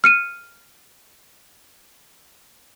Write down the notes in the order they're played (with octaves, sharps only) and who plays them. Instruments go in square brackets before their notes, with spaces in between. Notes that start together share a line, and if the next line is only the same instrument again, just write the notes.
[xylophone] F6 C#7 D#7